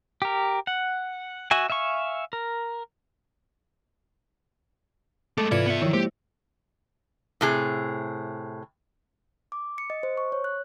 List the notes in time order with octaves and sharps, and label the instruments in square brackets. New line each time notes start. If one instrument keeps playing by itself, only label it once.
[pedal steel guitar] G4 A#4
F#5
F#4 E5 G#5
E5 F5 G#5 C#6
A#4
[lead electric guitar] G#3 A3 [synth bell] A4 [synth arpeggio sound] D6
[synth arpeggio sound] G#2 C3 G#6 [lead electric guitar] E4 B4 [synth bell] F4 D5 C#7
[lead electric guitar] B3 E5
[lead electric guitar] D#3 [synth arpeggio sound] F3 C#5 [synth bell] E4
[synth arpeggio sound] G#3 A#3 C5 [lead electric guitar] G4
[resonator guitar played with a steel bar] A2 C3 G#4
[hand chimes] D6
C#7
D#5
C5
C#6
C#5
F#6